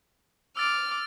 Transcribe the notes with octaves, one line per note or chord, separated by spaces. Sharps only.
D6 E6 F6 A6 D7